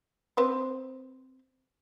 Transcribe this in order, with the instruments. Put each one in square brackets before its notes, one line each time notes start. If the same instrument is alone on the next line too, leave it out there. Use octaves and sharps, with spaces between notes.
[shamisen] C4 B4 C5